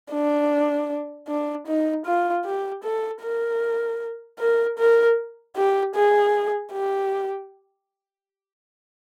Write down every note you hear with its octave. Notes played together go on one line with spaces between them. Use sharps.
D4
D4
D#4
F4
G4
A4
A#4
A#4
A#4
G4
G#4
G4